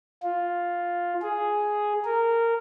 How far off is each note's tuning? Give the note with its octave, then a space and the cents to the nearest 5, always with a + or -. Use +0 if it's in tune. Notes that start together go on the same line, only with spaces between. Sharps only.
F4 +5
G#4 +5
A#4 -15